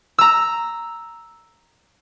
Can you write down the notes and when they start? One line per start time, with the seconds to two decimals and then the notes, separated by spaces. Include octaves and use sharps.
0.18 A#5 E6